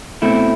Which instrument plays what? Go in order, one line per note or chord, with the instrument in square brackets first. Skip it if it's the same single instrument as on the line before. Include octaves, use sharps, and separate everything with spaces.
[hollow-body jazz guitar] B2 A3 C4 E4